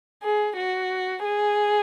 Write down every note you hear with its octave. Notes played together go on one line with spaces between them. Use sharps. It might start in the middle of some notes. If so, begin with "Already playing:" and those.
G#4
F#4
G#4